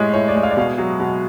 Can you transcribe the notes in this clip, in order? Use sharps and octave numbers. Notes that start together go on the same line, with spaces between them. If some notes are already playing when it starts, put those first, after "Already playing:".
Already playing: A2 G#3 C#5
A2 C#5
D5
G#3
F5
D5
B2 F5
F#3
B2